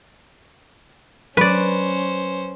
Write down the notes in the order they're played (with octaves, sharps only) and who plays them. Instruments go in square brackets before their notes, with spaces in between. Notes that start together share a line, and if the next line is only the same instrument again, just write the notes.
[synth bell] F#3 [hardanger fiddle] C#4 C5 [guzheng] B4 D5